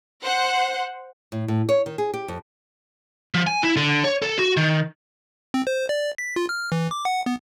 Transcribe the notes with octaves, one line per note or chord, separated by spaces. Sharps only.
C5 F#5
A2
A2
C#5
D#3
G#4
G4
F2
F3
G#5
E4
D3
C#5
A4
F#4
D#3
C4
C5
D5
B6
F4
F6
E3
D6
F#5
B3